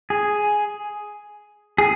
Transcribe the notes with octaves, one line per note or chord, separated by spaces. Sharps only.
G#4
G#4